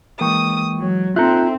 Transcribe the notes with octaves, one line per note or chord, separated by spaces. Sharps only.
E3 G#3 A#3 G5 C#6 D#6
F#3
C4 D#4 F4 A4 E5 A#5 F#6 G6